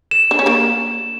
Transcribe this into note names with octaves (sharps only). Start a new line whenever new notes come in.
E7
D4
C#4
A#3 D4